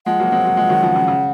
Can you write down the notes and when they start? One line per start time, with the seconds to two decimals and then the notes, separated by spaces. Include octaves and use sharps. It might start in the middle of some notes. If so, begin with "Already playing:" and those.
0.06 F3 G#3 F#5
0.20 F#3 A#3
0.32 G#3 C4
0.45 F#3 A#3
0.57 F3 G#3
0.69 D#3 F#3
0.82 C#3 F3
0.96 C#3
1.08 C#3